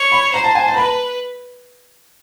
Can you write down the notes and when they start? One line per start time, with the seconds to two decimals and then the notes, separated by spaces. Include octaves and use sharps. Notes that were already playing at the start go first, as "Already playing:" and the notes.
Already playing: C#5
0.12 B5
0.34 C5 A#5
0.44 A5
0.55 G#5
0.67 A5
0.74 A#5
0.77 B4 B5